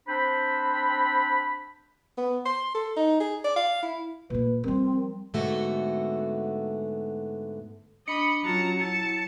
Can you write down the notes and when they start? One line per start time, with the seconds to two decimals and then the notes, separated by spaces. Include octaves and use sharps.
0.07 C4 D4 C5 B5
2.18 B3
2.46 C6
2.75 A4
2.97 D#4
3.20 G#4
3.44 D5
3.56 F5
3.83 E4
4.30 A#2 A#3 B4
4.64 F3 G3 C4 A#4
5.34 G#2 D3 A3 B3 F#4
8.08 D4 D#5 B5 C#7
8.44 F#3 C#4 F4 F#4 A5 A#5
8.80 E4 A5